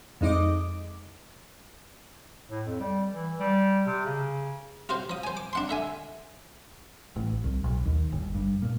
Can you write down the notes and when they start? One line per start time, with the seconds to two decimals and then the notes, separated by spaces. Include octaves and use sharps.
0.21 F2 G#3 D#4 D#5 D6
2.50 A2
2.66 F2
2.80 G3
3.12 E3
3.40 G3
3.86 C3
4.06 C#3
4.89 F4 F#4 C5
5.10 F3 D#6
5.24 C5 G#5
5.37 D6
5.53 D4 F#5 C6
5.69 D3 E5 G#5
7.16 A1
7.44 C2
7.64 B1
7.86 D#2
8.13 G1
8.35 G2
8.62 A#2